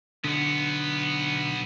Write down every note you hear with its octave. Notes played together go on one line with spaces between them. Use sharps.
B1 D3 B3